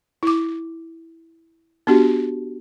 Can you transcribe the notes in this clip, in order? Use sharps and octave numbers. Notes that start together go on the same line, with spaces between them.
E4 D6
B3 D4 F#4 G4